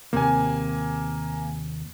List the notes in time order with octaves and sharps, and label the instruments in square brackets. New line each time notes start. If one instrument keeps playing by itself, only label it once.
[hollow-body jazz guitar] D#2 C3 [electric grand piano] A#3 G#5